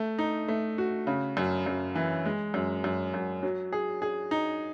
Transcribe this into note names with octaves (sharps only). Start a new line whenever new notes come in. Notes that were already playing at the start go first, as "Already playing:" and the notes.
Already playing: A3
D#4
A3
F#4
C#3
F#2
F#2
E3
G#3
F#2
F#2
F#2
F#3
G#4
G#4
D#4